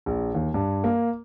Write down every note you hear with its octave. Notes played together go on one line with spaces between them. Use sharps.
A#1
D#2
G2
A#3